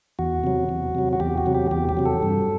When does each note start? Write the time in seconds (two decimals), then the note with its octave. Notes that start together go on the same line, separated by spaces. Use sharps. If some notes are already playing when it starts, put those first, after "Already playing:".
0.19 E2 F#4
0.44 C3 F#3
0.69 E2
0.95 C3 F#3
1.13 F#4
1.20 E2 G4
1.38 F#4
1.46 C3 F#3
1.54 G4
1.71 E2 G4
1.89 G4
1.97 C3 F#3
2.05 A4
2.23 G2